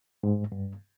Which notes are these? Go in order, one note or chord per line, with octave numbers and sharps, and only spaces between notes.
G#2
G2